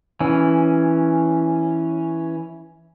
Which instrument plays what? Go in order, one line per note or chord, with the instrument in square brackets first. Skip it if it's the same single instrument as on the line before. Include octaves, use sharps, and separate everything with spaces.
[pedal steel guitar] E3 C#4